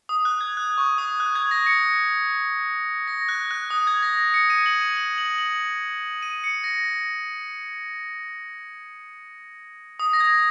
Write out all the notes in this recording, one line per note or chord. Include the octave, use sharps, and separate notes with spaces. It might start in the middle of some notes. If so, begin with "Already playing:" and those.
D#6
F#6
G#6
F#6
C#6
D#6
F#6
G#6
A#6
C#7
A#6
F#6
F#6
D#6
G#6
A#6
A#6
C#7
D#7
F#7
D#7
F#7
F#7
F#7
D#7
C#7
A#6
D#6
A#6
G#6